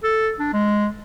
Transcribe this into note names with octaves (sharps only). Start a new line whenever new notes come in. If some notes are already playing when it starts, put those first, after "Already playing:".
A4
D4
G#3